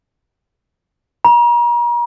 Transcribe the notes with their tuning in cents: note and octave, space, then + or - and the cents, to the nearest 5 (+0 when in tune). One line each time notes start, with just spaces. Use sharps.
A#5 +40